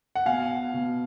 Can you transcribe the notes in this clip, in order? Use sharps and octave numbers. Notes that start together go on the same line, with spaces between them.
F#5
B2 F5 G#5
B2